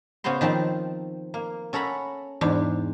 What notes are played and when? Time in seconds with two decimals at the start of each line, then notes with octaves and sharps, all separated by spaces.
0.24 C#3 B3 F#4 C5 C6
0.41 D#3 F3 C4 A5
1.34 A#3
1.73 C#4 A4 F#5 A#5 B5
2.41 E2 G#2 D4